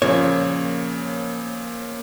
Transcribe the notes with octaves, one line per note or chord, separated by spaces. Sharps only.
A#2 C#3 F3 A#3 C#5